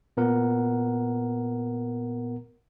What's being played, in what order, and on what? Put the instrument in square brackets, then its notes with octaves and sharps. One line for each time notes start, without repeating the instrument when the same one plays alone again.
[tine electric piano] A#2 B3 A#4 F#5